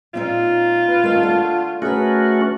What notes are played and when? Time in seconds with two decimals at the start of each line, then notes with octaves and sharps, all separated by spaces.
0.14 A#2 C4 D#4 F4
0.88 B4
1.03 D#3 A3 C4
1.23 D3 A3
1.82 A3 C#4 F#4 G#4 A#4 B4